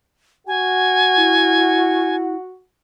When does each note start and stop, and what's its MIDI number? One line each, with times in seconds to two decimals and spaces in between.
0.47 2.60 66
0.47 2.16 80
1.17 2.35 64